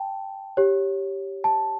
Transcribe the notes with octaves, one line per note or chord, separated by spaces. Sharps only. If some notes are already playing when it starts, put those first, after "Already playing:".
Already playing: G5 A5
G4 C#5
A5